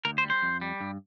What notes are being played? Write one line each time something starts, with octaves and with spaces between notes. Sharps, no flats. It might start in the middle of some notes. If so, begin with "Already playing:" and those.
D2 A#4
C5
G3
C5
F2
G3
G2